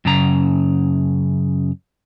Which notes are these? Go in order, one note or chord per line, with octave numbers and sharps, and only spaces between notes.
F#2 C#3 A#5